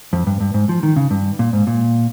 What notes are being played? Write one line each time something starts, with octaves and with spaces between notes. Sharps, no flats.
F2
G2
G2
G#2
F3
D#3
C#3
G2
A#2
G#2
A#2